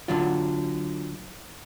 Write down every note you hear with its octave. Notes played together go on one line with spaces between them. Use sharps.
D3 F#3 F4